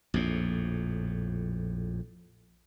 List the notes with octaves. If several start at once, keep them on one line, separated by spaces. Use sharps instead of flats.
A#1 F2 A2